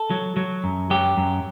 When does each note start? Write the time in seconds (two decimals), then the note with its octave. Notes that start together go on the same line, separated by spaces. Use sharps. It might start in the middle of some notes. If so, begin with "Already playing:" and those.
Already playing: A4
0.10 F#3
0.37 F#3
0.64 F#2
0.90 F#3 G4
1.17 F#2